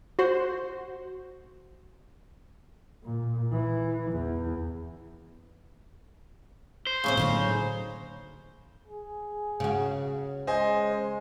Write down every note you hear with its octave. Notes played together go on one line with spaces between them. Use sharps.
F#4 C5
A#2
E3
E2
C5
D#2 A2 C#3 C4
A2 D3 F#3 A#3 D#4 C#5
G#4
C#3 F#4
G#3 C5 D#5 G#5